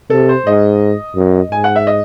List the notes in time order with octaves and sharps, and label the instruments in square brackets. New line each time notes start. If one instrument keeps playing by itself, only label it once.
[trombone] C3 [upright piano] A4
[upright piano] C5
[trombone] G#2 [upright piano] D#5
[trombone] F#2
[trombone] G#2 [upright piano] G#5
[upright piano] F#5
E5
D#5